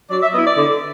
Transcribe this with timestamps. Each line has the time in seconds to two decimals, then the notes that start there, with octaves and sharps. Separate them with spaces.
0.11 F#3 D5
0.22 E5
0.34 B3 E4 D#5
0.45 D5
0.57 D3